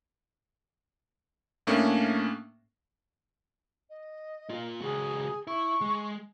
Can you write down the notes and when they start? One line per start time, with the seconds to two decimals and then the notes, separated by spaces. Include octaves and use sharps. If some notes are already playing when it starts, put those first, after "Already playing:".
1.67 A2 A3 A#3 C#4 D4
3.89 D#5
4.49 A#3 F4
4.82 C#2 F#4 G#4
5.47 E4 C#6
5.81 G#3